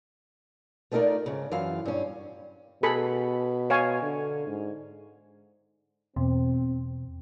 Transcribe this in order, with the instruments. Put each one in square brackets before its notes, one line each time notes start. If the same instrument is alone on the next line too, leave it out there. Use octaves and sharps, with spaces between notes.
[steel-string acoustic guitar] A3 B3 D#4 F4 A#4 D5
G#2 C#3
F#2 E3 F4 F5
G2 C#4
[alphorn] B2 [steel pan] G#4 A4 B5
[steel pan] C#5 F5 G#5
[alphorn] D3
G#2
[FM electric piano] E2 B2 [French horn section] C4